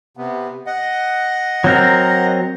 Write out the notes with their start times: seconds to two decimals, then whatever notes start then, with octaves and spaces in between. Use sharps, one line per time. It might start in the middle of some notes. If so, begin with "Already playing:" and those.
0.17 C3 B3
0.66 D#5 F#5
1.64 F#3 C4 A#4